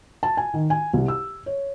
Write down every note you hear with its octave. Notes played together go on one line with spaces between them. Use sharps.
A5
G#5
D#3
G#5
C2
E6
C#5